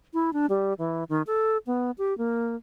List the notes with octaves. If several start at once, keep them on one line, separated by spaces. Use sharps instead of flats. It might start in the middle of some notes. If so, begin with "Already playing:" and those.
E4
D4
G3
E3
D#3
A4
B3
G4
A#3